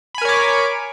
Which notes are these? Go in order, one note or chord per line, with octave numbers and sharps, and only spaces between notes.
A#4 C#5 G#5 B5 D6